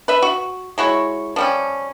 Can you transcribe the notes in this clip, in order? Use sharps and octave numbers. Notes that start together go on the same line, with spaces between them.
B4 E5
F#4
G#3 E4 F#4 C#5
F3 G3 C#4